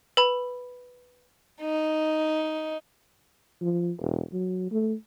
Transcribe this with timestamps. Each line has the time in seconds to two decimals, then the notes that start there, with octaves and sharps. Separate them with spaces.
0.17 B4 B5
1.61 D#4
3.61 F3
4.01 E1
4.33 F#3
4.71 A3